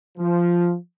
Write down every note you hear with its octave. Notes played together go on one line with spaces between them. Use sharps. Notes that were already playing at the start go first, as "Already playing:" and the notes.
F3